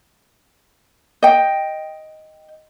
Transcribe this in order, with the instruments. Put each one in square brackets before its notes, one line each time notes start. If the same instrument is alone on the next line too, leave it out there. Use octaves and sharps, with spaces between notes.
[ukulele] D#5 G5